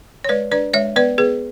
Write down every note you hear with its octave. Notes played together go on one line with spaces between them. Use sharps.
C#5
G#3 B4 D5
D4 B4 D5
G#3 C#5 E5
B3 B4 D5
B3 G#4 B4